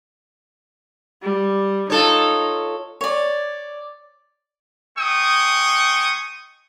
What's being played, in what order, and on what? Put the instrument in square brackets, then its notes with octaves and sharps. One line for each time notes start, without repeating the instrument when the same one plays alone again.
[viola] G3
[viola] D#4 [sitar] F4 A4 C#5
[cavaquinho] C#5 D5
[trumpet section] G#3 G5 C#6 D#6